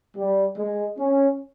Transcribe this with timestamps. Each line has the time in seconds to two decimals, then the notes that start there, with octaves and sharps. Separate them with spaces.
0.16 G3
0.57 G#3
0.98 C#4